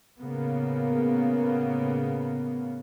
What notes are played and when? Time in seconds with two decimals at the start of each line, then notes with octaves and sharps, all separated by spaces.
0.19 A2 C#3 A#3 B3